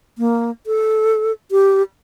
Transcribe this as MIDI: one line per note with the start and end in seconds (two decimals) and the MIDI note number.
0.18 0.51 58
0.66 1.32 69
1.51 1.83 67